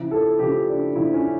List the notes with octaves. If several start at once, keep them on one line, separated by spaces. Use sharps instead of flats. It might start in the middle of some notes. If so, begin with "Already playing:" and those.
Already playing: C#3 F3 E4
A4
C#3 F3 G4
D4
C#3 F3 E4
C#4